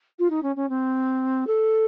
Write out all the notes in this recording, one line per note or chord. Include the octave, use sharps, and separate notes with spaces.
F4
D#4
C#4
C#4
C4
A4